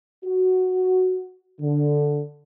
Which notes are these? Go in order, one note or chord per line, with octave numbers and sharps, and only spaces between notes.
F#4
D3